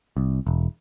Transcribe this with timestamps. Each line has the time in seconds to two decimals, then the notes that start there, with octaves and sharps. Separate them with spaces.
0.17 C2
0.47 E1